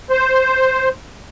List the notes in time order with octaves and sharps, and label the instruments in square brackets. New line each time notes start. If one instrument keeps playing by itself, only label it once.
[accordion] C5